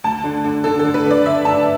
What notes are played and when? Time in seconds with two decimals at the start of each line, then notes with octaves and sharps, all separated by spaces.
0.04 D2 A5
0.24 D3
0.44 D3
0.64 D3 A4
0.79 A4
0.84 D3
0.94 B4
1.05 D3
1.11 D5
1.26 D3 E5
1.45 D3 A5